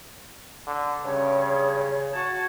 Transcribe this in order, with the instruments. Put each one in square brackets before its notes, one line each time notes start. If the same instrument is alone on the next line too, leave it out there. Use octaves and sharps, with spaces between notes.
[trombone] D3
[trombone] G2 [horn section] C#3 [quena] C#5
[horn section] F#4 A5 [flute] G#6